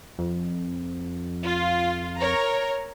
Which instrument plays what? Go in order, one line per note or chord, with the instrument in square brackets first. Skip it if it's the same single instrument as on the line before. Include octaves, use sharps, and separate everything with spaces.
[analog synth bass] F2
[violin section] F4
A#4 C#5 A#5